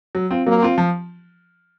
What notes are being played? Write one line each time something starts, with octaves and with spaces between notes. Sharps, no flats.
F#3
C4 F4
F#3 A#3
C4 F4
F3